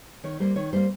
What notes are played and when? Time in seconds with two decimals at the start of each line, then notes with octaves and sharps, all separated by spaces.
0.24 D#3 C#5
0.40 G3 A#3 C5
0.56 D#3 C#5
0.73 G3 A#3 C5